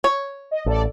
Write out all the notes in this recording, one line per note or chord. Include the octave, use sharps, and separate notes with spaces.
C#5
D#5
A1 A4 D5